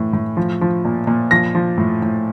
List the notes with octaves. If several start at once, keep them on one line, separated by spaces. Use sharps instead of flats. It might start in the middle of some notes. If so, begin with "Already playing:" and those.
Already playing: A2 E3
A2
F3
F3
A#2
A#2
F3 A#6
F3
A2
A2